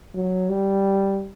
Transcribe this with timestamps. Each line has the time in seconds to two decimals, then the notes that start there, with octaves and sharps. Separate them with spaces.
0.14 F#3
0.50 G3